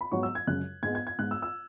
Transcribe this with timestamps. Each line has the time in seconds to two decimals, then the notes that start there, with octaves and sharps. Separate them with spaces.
0.01 B5
0.12 G#2 F#3 B3 C#6
0.23 E6
0.35 G#6
0.47 F#2 C#3 G#3 F#6
0.83 G#2 G#3 B3 G#6
0.95 G#6
1.07 G#6
1.18 G#2 G#3 B3 F#6
1.31 E6
1.42 E6